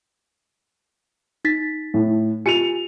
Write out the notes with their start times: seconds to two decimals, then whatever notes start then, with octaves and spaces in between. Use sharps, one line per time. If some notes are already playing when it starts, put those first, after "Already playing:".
1.45 D#4 A6 B6
1.94 A2
2.46 F4 G4 G#5 C#7 D#7 F7